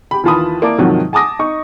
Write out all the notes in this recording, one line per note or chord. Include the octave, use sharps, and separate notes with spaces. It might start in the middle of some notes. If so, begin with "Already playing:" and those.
G4 B5
D#2 E3 F4 A5 B5 D#6
A#3 E4 A#4 D5 A5 D6
G#2 C3 D#3 F3 F#3
G#5 A5 D6 D#6 A#6
D#4 C#6